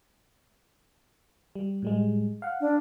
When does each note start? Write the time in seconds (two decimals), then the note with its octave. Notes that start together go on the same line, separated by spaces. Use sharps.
1.55 G3
1.82 A2 G3 G#3
2.42 F5 F#5
2.61 D4